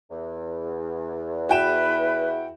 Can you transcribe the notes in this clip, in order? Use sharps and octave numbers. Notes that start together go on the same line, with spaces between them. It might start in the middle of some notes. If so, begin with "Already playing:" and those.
E2
E4 F#4 B4 G5 E7